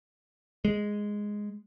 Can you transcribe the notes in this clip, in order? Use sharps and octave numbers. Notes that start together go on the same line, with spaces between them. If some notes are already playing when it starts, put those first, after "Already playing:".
G#3